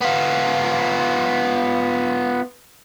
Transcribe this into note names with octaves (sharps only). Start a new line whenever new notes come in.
B3 F4